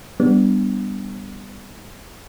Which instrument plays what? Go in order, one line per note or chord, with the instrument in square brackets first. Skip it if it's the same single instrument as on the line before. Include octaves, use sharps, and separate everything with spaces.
[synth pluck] G3 B3 D4